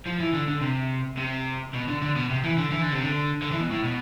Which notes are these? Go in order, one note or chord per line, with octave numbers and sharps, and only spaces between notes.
F3
E3
D3
D3
C3
C3
B2
D3
D3
B2
C3
E3
D3
E3
D3
C3
D3
D3
E3
B2
A2
B2